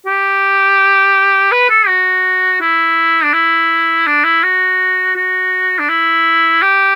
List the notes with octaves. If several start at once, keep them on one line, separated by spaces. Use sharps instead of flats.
G4
B4
A4
F#4
E4
D4
E4
D4
E4
F#4
F#4
D4
E4
G4